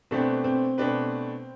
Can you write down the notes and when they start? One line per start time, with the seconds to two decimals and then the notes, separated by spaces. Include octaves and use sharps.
0.11 B2 A3 C4 D4 G4 B4
0.44 C4
0.78 B2 A3 D4 G4 B4